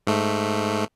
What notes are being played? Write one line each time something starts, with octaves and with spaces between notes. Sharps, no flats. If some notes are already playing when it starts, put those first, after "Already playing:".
G#2 A3